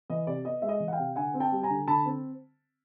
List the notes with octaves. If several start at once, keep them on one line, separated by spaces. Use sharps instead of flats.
E3 D#5
C3 D5
B3 D#5
G#3 E5
D#5
E3
F#5
F5 G5
C3
D3 F#5 G#5
C4
G5 A5
G3
G#5 A#5
D3
D3 A5 B5
C4